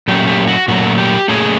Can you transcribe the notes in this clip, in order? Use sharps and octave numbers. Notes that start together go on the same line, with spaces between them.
A#2 F#3 A3 C#4 G4
G4
F#4
A#2 F#3 A3 C#4 F#4
G4
A#2 F#3 A3 C#4 G#4